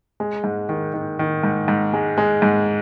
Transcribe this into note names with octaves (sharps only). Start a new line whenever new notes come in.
G#3
G#2
D#3
D#3
D#3
G#2
G#2
G#3
G#3
G#2